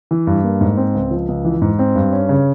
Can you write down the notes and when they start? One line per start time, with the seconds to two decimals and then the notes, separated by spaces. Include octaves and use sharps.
0.11 E3
0.27 G2
0.43 A#3
0.61 G#2
0.77 C4
0.95 C#2
1.11 F3
1.28 C#2
1.45 E3
1.62 G#2
1.79 C4
1.96 G2
2.13 C#4
2.29 C#3